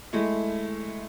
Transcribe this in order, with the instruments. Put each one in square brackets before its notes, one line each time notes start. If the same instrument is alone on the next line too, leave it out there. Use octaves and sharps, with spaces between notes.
[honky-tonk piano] G#3 A3 E4